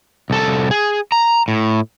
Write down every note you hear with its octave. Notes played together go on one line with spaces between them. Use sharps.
C2 A4
G#4
A#5
A2